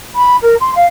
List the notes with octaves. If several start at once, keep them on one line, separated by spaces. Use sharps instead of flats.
B5
A#4
C6
F5